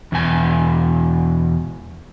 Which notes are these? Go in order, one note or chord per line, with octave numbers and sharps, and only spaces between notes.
E2 B2 G#5